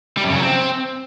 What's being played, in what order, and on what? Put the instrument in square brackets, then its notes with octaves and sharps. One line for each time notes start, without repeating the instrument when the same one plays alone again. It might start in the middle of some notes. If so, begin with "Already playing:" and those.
[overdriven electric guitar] G3
F#2
C#3
F#3
C4